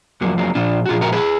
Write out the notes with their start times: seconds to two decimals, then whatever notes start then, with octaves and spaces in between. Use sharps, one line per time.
0.21 F2 F3 F#3 A#3
0.38 F#3 A#3
0.55 A#2 F3 D4 F4
0.86 F#4
0.89 A#2 F3 F4 G#4
1.01 F#4 A#4
1.12 G#4 B4